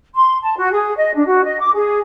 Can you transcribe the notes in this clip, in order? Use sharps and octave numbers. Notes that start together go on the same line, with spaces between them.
C6
A5
F#4
G#4
D#5
D4
F#4
D#5
D6
G#4